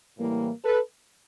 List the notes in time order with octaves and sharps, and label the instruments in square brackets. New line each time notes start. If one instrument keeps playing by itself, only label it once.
[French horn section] A2 E3 G3 A#3
A4 B4